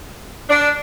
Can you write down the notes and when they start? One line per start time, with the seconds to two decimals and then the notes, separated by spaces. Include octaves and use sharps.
0.50 D4